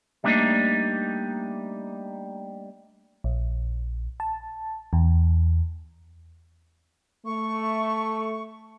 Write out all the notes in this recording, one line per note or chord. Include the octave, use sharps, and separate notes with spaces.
G3 A3 A#3 D4 D#4
A#1
A5
E2
A3 C#6